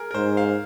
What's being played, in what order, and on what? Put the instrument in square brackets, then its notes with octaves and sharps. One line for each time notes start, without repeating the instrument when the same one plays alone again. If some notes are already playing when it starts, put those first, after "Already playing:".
Already playing: [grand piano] G#4 A#4
A#4
[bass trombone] G#2 [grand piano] C5
[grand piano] F5